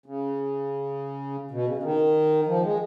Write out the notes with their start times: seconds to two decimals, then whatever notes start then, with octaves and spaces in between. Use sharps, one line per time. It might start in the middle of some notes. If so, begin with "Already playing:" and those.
0.06 C#3
1.51 B2
1.67 C#3
1.77 C#3
1.83 D#3
2.47 F3
2.63 G#3